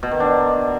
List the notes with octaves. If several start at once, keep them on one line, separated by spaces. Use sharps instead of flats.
B2
D#3
D4